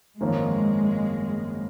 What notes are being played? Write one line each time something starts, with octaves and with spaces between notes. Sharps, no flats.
G#1 F#2 F3 G#3 A#3 C#4